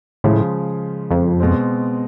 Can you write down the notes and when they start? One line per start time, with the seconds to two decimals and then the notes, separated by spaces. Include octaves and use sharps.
0.24 A2 C#3 F3 G#3
1.11 F2
1.40 B2 G#3 C4